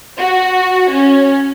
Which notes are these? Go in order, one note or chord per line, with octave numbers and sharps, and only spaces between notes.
F#4
C#4